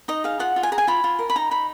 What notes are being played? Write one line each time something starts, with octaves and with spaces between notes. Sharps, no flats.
D#4 D#5
G#4 F5
F4 F#5
F4
G#5
G#4 A#5
G#5
F4 B5
F4
A#4
B5
D#4 A#5
D#4 B5